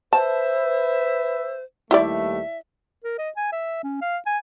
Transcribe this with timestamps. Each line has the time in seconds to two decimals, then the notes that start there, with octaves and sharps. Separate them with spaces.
0.13 B4 C5 E5 A5
1.91 D#2 G3 A3 E4 G4 D5 E5
3.04 A#4
3.18 D#5
3.36 G#5
3.52 E5
3.83 C#4
4.01 F5
4.26 G#5